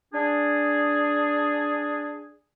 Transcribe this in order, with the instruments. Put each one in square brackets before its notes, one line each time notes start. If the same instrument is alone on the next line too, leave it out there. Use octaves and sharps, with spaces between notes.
[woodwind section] D4 G#4